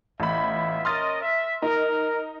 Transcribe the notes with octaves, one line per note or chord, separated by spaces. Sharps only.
A1 B3 F4 E5 B5
C#4 A#4 D#5 C6 F6 A6
E5
D#4 A#4